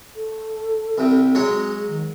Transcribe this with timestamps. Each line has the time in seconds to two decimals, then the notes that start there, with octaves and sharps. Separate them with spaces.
0.16 A4
0.98 C2 C3
1.35 F#3 G#3 G#4 C#5
1.88 D#3